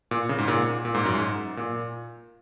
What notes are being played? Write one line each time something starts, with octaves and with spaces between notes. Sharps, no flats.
A#2
C#3
G#2
A#2
A#2
G#2
F#2
G#2
A#2